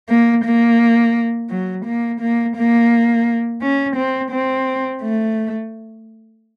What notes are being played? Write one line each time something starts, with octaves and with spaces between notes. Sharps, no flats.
A#3
A#3
F#3
A#3
A#3
A#3
C#4
C4
C4
A3